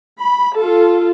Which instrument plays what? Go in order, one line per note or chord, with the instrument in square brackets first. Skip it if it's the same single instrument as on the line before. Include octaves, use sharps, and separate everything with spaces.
[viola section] B5
F4 A4